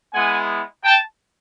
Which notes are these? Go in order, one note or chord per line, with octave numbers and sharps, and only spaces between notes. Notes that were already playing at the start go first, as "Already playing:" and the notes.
G#3 B3 E4 F#5 G#5
G5 A5